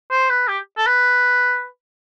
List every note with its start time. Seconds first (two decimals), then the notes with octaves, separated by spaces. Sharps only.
0.11 C5
0.30 B4
0.48 G4
0.78 A4
0.87 B4